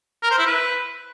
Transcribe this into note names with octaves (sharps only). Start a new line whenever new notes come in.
A#4
C5
E4
B4